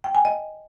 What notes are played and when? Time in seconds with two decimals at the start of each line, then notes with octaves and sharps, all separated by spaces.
0.04 G5
0.15 G#5
0.25 D#5